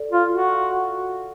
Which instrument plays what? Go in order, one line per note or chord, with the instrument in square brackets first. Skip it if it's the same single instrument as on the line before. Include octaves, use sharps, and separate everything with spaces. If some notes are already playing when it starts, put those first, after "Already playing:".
Already playing: [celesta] A4 D5
[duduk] F4
F#4